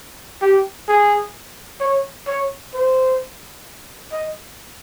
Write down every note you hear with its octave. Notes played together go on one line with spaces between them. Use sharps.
G4
G#4
C#5
C#5
C5
D#5